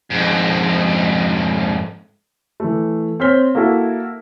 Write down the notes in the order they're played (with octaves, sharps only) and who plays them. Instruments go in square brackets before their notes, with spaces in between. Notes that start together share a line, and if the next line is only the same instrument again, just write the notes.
[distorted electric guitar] F2 G#2
[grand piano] E3 A3
C4 C5 C#5 F6 B6 G7
A#3 E4 F#4 A4